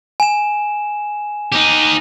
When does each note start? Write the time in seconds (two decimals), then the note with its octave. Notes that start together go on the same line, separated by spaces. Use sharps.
0.20 G#5 E7
1.52 D#4 G4